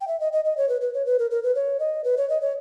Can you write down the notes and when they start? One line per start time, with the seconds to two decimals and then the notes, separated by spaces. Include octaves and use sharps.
0.01 G5
0.08 E5
0.20 D#5
0.33 D#5
0.45 D#5
0.57 C#5
0.69 B4
0.81 B4
0.94 C#5
1.06 B4
1.19 A#4
1.31 A#4
1.43 B4
1.55 C#5
1.80 D#5
2.04 B4
2.17 C#5
2.30 D#5
2.41 C#5